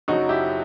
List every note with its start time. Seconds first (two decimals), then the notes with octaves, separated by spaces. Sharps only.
0.08 F#1 F#2 F#3 D#4 F#4
0.29 E4 G4